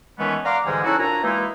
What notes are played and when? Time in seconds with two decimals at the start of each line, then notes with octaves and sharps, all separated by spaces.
0.19 D#3 E3 G#3 A3 B3 C#4
0.45 D5 F5 F#5 A#5 C6 D6
0.66 G#2 D3 E3 G3 G#3
0.84 C#4 D#4 E4 F#4 A4 B4
0.99 A#2 D4 F#4 G#5 A#5
1.24 E3 G#3 A#3 D#4 E4